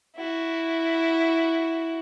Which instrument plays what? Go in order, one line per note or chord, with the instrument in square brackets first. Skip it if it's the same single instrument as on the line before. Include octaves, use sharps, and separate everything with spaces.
[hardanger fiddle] E4 F#4